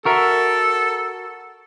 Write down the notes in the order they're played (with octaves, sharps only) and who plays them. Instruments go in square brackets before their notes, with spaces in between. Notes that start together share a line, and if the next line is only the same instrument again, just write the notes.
[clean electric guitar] F#4 A#4 E5 [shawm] A4